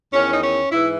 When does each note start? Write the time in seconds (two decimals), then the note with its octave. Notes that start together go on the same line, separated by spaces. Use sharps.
0.13 E2 D#3 C#4
0.34 D#4
0.42 C#4
0.71 G#2 E3 E4